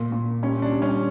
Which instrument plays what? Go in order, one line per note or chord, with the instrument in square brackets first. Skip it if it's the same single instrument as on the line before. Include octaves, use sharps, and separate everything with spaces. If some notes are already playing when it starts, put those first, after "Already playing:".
Already playing: [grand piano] A#2
A#2
G3 C#4
D4
G3
C#4